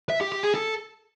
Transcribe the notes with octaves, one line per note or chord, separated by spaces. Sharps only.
E5
G4
G4
G#4
A4